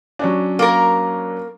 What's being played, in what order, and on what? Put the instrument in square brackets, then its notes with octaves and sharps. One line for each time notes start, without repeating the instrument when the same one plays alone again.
[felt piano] F#3 C#4 D4
[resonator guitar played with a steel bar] A#3 A#4